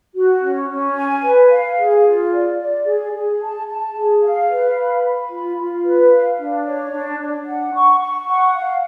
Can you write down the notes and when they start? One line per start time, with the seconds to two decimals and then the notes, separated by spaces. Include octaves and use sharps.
0.14 F#4
0.42 C#4
0.69 C#4
0.95 G#5
1.23 B4
1.49 F5
1.77 G#4
2.04 F4
2.31 D5
2.58 D5
2.86 G#4
3.12 G#4
3.40 A5
3.67 A5
3.94 G#4
4.21 F5
4.48 B4
4.76 B5
5.03 B5
5.29 F4
5.57 F4
5.84 B4
6.10 F5
6.38 D4
6.65 C#5
6.92 D4
7.19 D4
7.46 F#5
7.73 C#6
8.00 C#6
8.27 F#5
8.54 F5